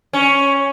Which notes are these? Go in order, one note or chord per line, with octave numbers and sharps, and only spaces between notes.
C#4